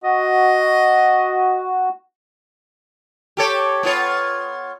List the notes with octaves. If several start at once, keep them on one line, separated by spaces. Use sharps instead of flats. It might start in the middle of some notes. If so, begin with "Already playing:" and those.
F#4 D#5
G4 A4 C#5
B3 F4 C#5